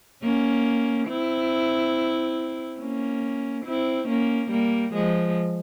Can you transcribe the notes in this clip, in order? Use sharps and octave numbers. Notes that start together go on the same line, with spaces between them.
A#3 C#4
C4 E4
A#3 C#4
C4 E4
A#3 C#4
G3 A#3
F3 G#3